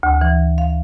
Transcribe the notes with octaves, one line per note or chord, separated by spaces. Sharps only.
D2
E3
F5